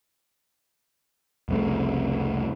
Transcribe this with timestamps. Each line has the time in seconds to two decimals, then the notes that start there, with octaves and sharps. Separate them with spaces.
1.49 F1 C2 C#3 A3